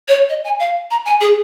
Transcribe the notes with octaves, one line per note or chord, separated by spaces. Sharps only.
C#5
D#5
G#5
F5
A#5
G#5
G#4